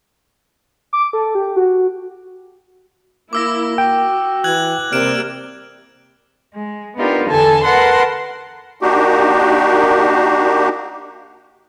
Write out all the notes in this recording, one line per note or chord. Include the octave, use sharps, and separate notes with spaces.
D6
A4
G4
F#4
A#3 E4 D6 E6 A#6
F#4 G5
E3 F#6 G#6 F#7
C3 G3 A#3 D5 F6 D7 E7
G#3
B3 D4 D#4 F4 G4 A#4
E2 D3 A4 G#5 A5
A#4 B4 F#5 A5 C6
A#3 D4 D#4 F#4 G4